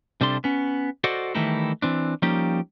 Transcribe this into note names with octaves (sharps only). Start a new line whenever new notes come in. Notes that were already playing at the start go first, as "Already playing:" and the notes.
C3 G3 D4 A4 C6
B3 C#4
F#4 A4 C5 D5 D#5 F#5
D#3 E3 G3 A3 D#4 E4
E3 C4 D4
F3 G3 A#3 C#4 D#4 G4